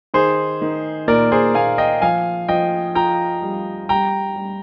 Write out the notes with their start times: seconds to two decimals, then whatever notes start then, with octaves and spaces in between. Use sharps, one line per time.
0.14 D#3 G#4 C5
0.62 D#3
1.08 A#2 A#4 D5
1.32 G#4 C5
1.55 A#2 F5 G#5
1.78 D#5 G5
2.02 F3 F5 G#5
2.48 F3 D#5 G5
2.95 F4 G5 A#5
3.42 G3
3.89 G3 G5 A#5
4.36 G3